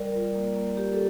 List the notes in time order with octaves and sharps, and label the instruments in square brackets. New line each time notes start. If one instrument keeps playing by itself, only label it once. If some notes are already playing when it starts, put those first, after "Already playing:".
Already playing: [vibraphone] G3 A#4 D5
F4
A#3
A#3
A#3 G4
A4